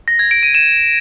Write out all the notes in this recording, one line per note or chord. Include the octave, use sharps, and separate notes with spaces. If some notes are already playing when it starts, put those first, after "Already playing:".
A#6
G#6
D7
D#7
E7